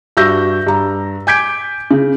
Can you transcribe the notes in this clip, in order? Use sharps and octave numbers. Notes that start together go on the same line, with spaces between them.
G2 F#4 E5 E6 G6 A#6
G2 A#5
G#5 D6 G6 G#6 B6 D7
C#3